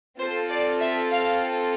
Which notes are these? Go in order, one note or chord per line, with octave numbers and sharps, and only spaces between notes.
C4 F4 A4 C5
D5
E5
F5